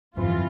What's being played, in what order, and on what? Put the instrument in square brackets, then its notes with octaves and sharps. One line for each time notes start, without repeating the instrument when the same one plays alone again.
[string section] G1 F2 E3 F4